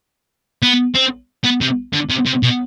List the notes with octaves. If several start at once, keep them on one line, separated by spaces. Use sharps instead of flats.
B3
C4
B3
C3
D3
C3
C3
B2